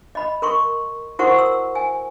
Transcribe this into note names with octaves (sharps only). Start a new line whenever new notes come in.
D#5 B5
A#4 C6 C#6
E4 F#4 A#4 C5 F#5 C#6
E6
G#5